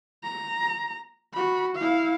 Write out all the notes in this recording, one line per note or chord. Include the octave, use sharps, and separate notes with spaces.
A#5
F#4 B5
E4 F5